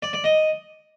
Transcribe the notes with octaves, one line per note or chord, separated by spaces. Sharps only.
D5
D5
D#5